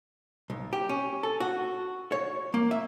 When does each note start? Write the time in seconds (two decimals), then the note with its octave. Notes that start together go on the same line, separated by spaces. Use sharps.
0.50 B1
0.73 G4
0.89 C#4
1.23 A4
1.40 F#4
2.12 C#5
2.54 A#3
2.71 E5